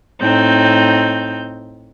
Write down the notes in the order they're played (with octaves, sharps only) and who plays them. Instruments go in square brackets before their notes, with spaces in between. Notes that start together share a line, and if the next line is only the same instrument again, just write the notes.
[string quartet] A2 C4 D#4 G6